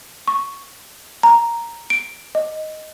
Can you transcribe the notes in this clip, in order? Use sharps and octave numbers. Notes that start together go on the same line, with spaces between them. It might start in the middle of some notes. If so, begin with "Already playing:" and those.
C#6
A#5
D7
D#5